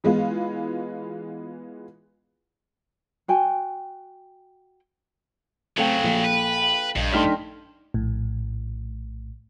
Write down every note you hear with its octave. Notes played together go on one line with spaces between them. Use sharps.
E3 G#3 B3 F4
F#4 G5 G#5
C#3 F#3 A3 C4 A4 F5 G5
A#1
B4
A#1 G2 D#5
A3 D4 D#4 D#5 G5 C6 F6 B6
A#1 A2